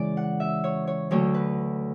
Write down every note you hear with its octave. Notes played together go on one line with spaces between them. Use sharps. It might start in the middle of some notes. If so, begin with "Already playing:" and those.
Already playing: C#3 E3 G#3 D5
F#5
E5
C#5
C#5
D2 D3 F#3 A3 C#5
B4